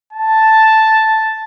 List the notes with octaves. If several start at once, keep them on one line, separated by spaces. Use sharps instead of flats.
A5